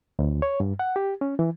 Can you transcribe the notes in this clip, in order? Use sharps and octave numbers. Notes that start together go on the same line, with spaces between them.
D2
C#5
G2
F#5
G4
C#4
E3